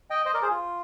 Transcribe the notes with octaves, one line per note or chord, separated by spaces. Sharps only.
D#5 G5
C5 D#5
A#4 D5
G#4 C5
F4